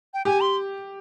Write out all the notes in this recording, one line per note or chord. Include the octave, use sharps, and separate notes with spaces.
G5
G4 G#5
C6